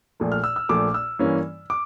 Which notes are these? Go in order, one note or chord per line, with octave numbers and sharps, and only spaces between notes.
A#1 A#2 A3
F6
E6
E6
A#1 A#2 A3 D6
E6
G2 E3 A#3 C#4
D6